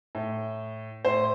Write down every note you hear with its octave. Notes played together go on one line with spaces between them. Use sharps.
A2
A2 C5